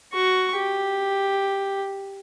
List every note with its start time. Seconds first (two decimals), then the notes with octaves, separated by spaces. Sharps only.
0.13 F#4 C#6
0.56 G4